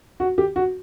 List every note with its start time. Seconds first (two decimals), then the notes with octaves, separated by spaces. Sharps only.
0.20 F#4
0.38 G4
0.56 F#4